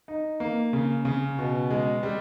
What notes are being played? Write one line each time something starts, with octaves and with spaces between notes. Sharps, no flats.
D#4
A#3
C#3
C#3
B2
G#3
G3